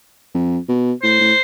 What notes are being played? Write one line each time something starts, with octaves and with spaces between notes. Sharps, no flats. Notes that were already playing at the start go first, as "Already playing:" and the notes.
F2
B2
A2 C5
A2